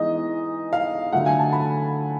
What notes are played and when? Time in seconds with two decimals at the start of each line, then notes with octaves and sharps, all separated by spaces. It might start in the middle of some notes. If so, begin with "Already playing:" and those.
Already playing: E3 G#3 B3 D#4 D#5
0.73 F5
1.13 D3 F#3 A3 F#5
1.26 G#5
1.39 A5
1.53 B5